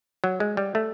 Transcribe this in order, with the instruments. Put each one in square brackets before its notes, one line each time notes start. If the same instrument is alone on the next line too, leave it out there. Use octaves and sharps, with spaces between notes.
[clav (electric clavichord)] F#3
G#3
G3
A3